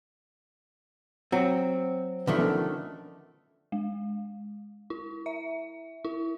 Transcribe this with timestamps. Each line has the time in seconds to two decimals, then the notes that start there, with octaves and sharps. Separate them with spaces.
1.32 F#3 C4
2.27 D3 D#3 F3 A3 B4
2.39 B3 C#4 A4
3.72 G#3
4.90 E4
5.26 E5
6.05 E4